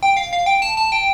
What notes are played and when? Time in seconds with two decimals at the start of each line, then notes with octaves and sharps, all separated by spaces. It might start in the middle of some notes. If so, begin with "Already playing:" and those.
0.03 G5
0.17 F5
0.33 F5
0.46 G5
0.62 A5
0.77 A5
0.92 G5